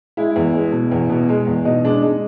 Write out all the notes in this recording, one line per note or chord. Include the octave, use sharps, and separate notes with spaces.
G#3 E4
E2
G#3
B2
E2
B2
G#3
E2
B2 D#4
G#3 D4
G#3 D#4